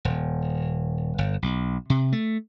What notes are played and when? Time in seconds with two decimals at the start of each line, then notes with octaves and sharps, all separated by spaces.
0.05 D#1
1.18 G1
1.42 B1
1.90 C3
2.13 A3